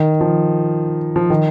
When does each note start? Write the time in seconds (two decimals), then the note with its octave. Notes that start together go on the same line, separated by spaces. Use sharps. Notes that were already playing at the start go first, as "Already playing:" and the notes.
Already playing: D#3
0.21 F3
1.16 F3
1.30 D#3